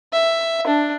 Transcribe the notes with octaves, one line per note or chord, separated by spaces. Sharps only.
E5
D4